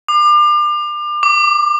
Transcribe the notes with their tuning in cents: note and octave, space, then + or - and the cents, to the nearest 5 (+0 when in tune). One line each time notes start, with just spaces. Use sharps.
D6 +35
D6 -5